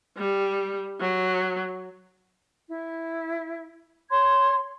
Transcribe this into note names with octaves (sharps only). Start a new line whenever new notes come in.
G3
F#3
E4
C#5 C6 G#6